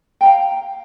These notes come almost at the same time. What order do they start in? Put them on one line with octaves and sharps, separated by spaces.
G5 A#5 F5